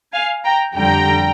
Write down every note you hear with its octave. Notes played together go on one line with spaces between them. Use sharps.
F5 G#5
G5 A#5
F2 D3 G3 G5 A#5